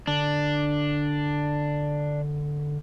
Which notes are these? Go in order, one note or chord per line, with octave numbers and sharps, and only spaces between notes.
D3 D4